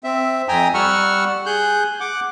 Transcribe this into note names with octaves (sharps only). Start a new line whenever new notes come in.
C4 E5
F2 G5 G#5 A#5 D#6
G3 F#5 C#6 E6 F6
G#4 F#6 G6
F#5 D6